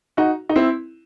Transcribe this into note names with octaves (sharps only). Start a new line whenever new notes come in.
D#4 F#4
D#4
C4 E4